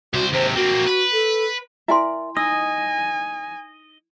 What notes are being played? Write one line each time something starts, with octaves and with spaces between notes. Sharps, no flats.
C2 F#4 C5
D#2 C3 C5
A#3 C4 F#4
B4
A4
E4 A#4 D5 E5 G#5 C6
D#4 D#5 G#5 E6